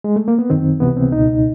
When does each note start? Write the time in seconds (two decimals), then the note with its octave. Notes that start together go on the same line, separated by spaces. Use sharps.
0.04 G#3
0.16 A3
0.28 A#3
0.39 B3
0.50 F#2 D#3 C4
0.80 C#2 C3 E3 B3
0.96 C4
1.11 C#2 B2 D#4